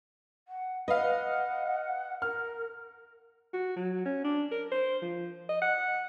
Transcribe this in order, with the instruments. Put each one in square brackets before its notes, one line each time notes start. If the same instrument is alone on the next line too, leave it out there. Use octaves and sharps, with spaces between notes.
[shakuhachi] F#5
[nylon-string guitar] B4 [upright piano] D#5 F5 [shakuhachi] F#5
[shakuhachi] A#4 [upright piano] F6
[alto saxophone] F#4
F#3
C#4
D4
A#4
C5
F3
D#5
F#5